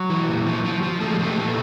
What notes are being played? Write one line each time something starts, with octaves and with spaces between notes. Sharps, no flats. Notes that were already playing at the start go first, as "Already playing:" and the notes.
Already playing: F#3
E3
A#2
F3
F3
F3
F3 A3
G#3
F3 A3
A#2